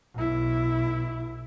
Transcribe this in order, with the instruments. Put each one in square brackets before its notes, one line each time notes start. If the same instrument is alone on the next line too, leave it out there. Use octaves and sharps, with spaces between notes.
[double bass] B1 E4